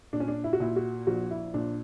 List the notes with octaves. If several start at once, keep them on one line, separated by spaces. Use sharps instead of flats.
A#2 D4
C#4
D4
E4
F#4
A#2 E4
F#4
A#1 F#4
E4
A#2 D4